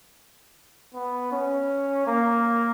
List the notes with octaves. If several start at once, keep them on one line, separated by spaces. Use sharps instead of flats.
B3
C#4
A#3